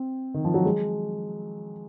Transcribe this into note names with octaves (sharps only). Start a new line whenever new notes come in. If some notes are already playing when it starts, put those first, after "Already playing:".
Already playing: C4
D#3
F3
F#3
G#3